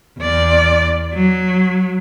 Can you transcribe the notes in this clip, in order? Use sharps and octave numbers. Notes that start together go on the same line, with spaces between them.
E2 D5
F#3